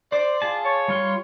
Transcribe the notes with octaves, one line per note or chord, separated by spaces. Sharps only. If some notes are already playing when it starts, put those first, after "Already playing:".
C5 D5
F4 G#4 A5
C#5
G3 F4 C6